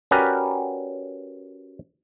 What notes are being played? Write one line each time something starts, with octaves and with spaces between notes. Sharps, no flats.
C#4 F#4 G4 A#4 B4 D5